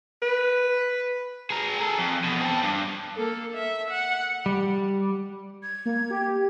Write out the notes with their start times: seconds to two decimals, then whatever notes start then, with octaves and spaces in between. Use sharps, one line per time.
0.22 B4
1.50 G#4 A#4
1.79 G#4 A4
1.99 F2
2.24 E2 B2
2.41 C4 A4
2.63 G2
3.16 A#3 A4
3.54 E5
3.90 F#5
4.46 G3
5.63 G#6
5.86 A#3
6.10 G4